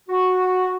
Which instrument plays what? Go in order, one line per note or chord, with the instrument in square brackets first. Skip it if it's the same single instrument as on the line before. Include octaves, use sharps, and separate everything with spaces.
[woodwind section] F#4